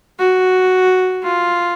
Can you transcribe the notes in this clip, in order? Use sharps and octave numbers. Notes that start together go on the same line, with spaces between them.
F#4
F4